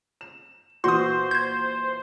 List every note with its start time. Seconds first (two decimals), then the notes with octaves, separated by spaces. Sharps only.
0.21 E7
0.84 A#2 E3 F#4 C5 C6 D#6
1.31 G6 G#6